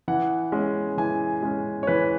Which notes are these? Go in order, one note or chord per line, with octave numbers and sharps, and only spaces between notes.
E3 F#5
G#3 C#4
E3 G#5
G#3 C#4
C#5
E3 B4